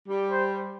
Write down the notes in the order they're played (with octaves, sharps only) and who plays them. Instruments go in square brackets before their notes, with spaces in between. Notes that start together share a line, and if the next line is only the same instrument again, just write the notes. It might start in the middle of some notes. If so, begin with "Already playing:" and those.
[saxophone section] G3
[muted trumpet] C5